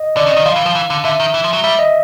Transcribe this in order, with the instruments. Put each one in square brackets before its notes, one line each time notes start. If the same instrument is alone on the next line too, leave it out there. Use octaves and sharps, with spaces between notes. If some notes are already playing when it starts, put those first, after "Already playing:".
Already playing: [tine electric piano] D#5
[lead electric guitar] D3 [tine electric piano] D5
[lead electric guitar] C#3
[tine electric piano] D#5
[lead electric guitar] D#3
[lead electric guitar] F3 [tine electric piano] F5
[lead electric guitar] E3
F3
E3
D3
[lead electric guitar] D3 [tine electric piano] E5
[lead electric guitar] D#3
E3
F3
F#3
[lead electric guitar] G3 [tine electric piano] E5
[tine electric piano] D#5